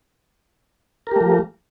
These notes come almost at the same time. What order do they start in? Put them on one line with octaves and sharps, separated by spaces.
A#4 G4 A3 F3